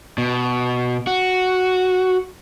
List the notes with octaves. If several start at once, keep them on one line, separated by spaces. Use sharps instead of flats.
B2
F#4